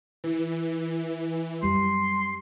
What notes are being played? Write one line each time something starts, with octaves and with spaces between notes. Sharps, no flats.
E3
F#2 G3 C6